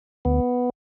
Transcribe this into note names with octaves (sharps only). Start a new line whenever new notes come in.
D2 B3